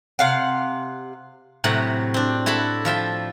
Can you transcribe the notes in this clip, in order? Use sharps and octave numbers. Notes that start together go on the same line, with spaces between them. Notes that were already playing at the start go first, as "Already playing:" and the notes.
C3 F5 F#5
A2 C3 F#3 F#5
C4 D4
E4 F#4 A4 A5 B5
F3 F4 E5 G5